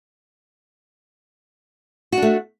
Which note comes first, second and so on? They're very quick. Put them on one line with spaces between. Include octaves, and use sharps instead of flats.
F#4 D4 A3